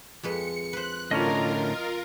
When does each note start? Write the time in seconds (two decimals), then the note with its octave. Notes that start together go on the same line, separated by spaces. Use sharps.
0.23 F2 G#3 B4 C#7
0.73 B4 C5 F#6
1.11 A2 D3 C#4 F4 A#4 D#5 A#5